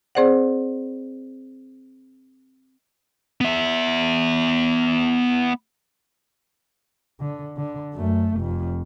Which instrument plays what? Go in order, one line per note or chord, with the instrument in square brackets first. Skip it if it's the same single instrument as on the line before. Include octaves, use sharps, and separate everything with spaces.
[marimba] C4 G#4 C5 D5 F#5
[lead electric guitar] B3 E5
[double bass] D3
D3
F#2 A3
F1 F2